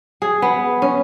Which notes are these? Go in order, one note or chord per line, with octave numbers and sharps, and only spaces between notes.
G#4
B3
C#4